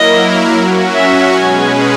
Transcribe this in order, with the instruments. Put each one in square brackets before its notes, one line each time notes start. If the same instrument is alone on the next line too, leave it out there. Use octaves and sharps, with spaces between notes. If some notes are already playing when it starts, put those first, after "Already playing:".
Already playing: [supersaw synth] F#3 A#3 E4 A#4 [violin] D#5
[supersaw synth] F#3 C#4 F#4
[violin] E5
[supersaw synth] B2 G#3 C#4 G#4 B4 [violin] G#5